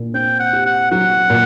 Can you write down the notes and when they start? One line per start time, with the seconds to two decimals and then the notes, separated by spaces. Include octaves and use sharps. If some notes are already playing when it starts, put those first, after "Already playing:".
Already playing: A#2
0.14 C4 G5
0.40 F#5
0.53 G4
0.66 F#5
0.91 F#3 F#5
1.30 A#2